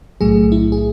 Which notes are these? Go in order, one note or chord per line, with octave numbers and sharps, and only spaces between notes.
B1 A2 F#3 A3 G#4
E4
G#4